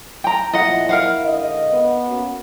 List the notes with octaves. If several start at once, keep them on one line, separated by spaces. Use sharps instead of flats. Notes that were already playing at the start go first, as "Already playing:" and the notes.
G5 A#5
E2 A#2 F3 E4 D#5 F#5
A#4 F5 F#5
G#2 D3 D#5
B3
A#3 C#4 F#4